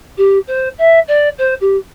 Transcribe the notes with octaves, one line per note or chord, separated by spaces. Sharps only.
G4
C5
E5
D5
C5
G4